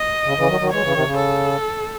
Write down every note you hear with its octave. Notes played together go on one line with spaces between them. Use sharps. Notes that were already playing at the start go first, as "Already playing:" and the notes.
Already playing: D#5
C#3
C#3 E3
D#3 F#3
D#3 F#3
E3 G#3 C#5
F#3
C#3 E3
C3 D#3
C#3
A4